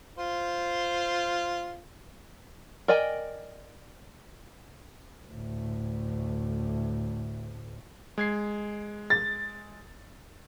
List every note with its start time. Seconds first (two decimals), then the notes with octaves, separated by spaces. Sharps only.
0.18 F4 C5
2.88 A#4 D5 D#5 G5 G#5
5.28 D2 A2
8.18 G#3 G#6 C7
9.10 A6